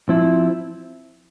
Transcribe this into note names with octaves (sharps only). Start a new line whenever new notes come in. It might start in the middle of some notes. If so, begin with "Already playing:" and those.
F3 C4 E4